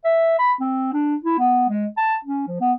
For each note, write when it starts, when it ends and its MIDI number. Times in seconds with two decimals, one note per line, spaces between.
0.05 0.35 76
0.39 0.52 83
0.60 0.91 60
0.93 1.15 62
1.24 1.38 64
1.38 1.67 59
1.69 1.86 56
1.97 2.15 81
2.24 2.47 61
2.47 2.56 53
2.61 2.73 59